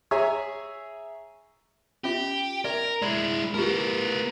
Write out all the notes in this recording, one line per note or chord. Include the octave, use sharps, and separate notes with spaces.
G#4 C#5 E5 G#5 A#5
C#4 F4 G4 E5
A#4 D5 E5
G#3 E4 D5
B3 D#4 F4 G4 A#4